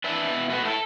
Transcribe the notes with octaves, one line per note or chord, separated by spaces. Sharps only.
D4 B4 E5
B2
A3 F#4 B4
E4 A4